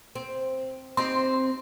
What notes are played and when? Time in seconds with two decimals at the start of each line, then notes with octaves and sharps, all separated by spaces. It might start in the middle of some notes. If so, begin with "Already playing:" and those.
0.15 C4
0.97 C4 D#4 G4 C6